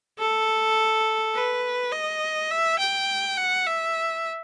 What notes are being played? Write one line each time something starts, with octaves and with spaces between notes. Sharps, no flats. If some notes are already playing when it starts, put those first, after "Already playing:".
A4
B4
D#5
E5
G5
F#5
E5